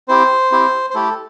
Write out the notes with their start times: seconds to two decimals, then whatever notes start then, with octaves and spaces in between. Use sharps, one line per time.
0.08 C4 E4 G4 C5
0.51 C4 E4 G4
0.90 C5
0.94 A3 E4 G4 A4